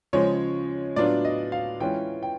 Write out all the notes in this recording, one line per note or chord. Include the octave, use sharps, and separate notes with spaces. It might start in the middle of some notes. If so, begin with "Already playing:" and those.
C#3 F3 G#3 C#5
A2 F#3 B3 D4 F4 D5
D#5
F5
E3 G#3 C#4 F4 G5
G5